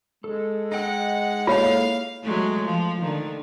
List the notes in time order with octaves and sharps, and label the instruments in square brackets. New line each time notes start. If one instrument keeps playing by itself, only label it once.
[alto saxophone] G#3 [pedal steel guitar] A4
[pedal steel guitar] D#4 G5 E6 [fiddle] F#5
[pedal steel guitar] A#3 E4 A4 [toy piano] F4 C#5 [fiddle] F5
[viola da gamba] F#3 G#3 A3
F3
D3 D#3